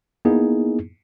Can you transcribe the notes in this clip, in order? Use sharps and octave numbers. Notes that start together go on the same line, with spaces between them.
A#3 B3 D#4 E4 G#4